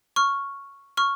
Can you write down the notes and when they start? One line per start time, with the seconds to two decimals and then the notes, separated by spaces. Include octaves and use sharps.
0.16 C#6 F6
0.97 C#6 F6